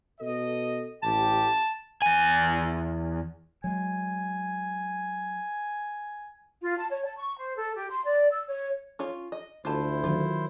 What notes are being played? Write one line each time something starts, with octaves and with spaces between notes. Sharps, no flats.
B2 A4 D#5
A1 G4 A5
E2 G#5
F#3 G#3 G#5
F4
A5
C#5
A5
C#6
C5
A4
G4
C6
D5
E6
C#5
C#4 F4 C#5
D#5
D2 E4 F4 C5 A5
D#3 F#3 F4